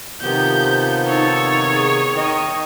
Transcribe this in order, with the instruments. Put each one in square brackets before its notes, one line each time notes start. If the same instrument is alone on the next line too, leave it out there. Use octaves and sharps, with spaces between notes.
[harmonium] C3 D#3 B3 [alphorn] F3 [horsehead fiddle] G4 [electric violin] G6
[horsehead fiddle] D#4 A4 [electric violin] C#5
[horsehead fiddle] G#4
[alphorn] D#3 [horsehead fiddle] D#5